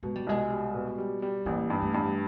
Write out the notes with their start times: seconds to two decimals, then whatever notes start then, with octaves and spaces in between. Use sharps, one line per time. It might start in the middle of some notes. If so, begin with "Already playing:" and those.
0.03 B2 G#3
0.15 G3
0.27 C2 G#3
0.50 G3
0.74 B2
0.98 G3
1.22 G3
1.46 A1 A#3
1.70 G2
1.82 A3
1.94 G2